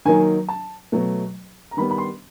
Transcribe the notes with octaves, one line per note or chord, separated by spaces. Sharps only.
D#3 F#3 A#3 D#4 G#5
A5
B2 F#3 A3
A#5
D#3 G3 B3 B5
B5
C6